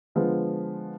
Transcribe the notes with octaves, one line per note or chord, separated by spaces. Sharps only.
D3 F3 G#3 B3